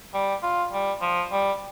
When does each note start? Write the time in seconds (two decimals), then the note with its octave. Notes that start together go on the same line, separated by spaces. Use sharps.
0.14 G3
0.43 F4
0.72 G3
1.02 F3
1.32 G3